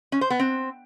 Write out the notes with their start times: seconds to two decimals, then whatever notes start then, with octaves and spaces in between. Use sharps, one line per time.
0.12 C#4
0.21 C5
0.30 B3
0.39 C4